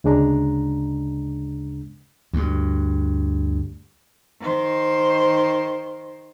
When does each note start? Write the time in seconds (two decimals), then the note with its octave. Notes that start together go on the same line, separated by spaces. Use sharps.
0.04 D2 C#3 G#3 D4 A#5
2.33 D2 G2
4.41 D#3 C5